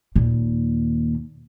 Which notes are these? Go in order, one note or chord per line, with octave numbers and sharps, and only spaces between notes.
D#2 A#2